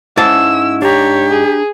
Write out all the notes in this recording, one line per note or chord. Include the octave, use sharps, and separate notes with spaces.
G#2 C#4 E4 A5 E6
D4 G4 C#5 A#5
G#4